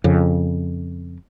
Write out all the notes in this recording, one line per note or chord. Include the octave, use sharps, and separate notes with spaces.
F2 C#3